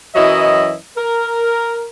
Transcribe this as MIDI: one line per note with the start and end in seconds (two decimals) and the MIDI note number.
0.15 0.76 42
0.15 0.76 52
0.15 0.76 54
0.15 0.76 64
0.15 0.76 75
0.96 1.88 70